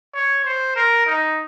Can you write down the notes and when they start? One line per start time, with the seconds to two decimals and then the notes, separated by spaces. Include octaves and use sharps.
0.14 C#5
0.45 C5
0.76 A#4
1.07 D#4